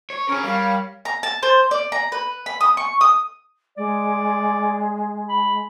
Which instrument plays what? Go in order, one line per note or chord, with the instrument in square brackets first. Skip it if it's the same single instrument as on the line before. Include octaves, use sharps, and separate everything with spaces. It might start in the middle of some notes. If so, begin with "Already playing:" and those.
[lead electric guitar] C#5
[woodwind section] C#4 [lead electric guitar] G#4 A#4
[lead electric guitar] G3 [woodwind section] A#4 C#5 F5
[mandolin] A#5
A5
C5
D5
A#5
B4
B5
D#6
C#6
D#6
[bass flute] G#3 [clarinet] D5
[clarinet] B5